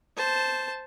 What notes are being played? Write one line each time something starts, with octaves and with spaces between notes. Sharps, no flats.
C5 A5